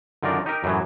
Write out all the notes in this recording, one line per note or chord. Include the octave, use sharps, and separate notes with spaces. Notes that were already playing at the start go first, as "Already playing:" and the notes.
F#2 D3 D#3 F4 A#4 D5
D#4 G4 A#4
F#2 A2 E3 F#3